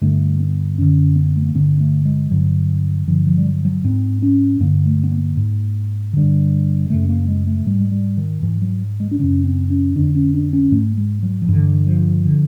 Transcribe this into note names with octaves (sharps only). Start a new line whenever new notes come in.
G2 D3 A3
B3
F#2 D3 C#4
B3
A3
A#3
G2 D3 B3
A3
G#3
G2 D3 F#3
G2 D3 F3
F3
G3
F#3
F#3
G#2 C4
C#4
G2 D3 A#3
A3
B3
A#3
G#2
G2 D3
F#2 C#3 A3
A#3
G#3
A3
G#2 G3
G#3
G3
D#3
G#2 E3
F#3
G#3
D4
F#2 C#3 C#4
C4
C#4
F2 D3 D4
C#4
D4
C#4
G#2 A3
G#3
F#3
F3
G2 D3 E3
F3
D3